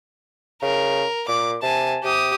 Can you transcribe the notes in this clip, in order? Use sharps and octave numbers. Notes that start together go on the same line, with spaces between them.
C#3 A#4
A#2 D6
C3 G#5 A5
C3 G4 D#6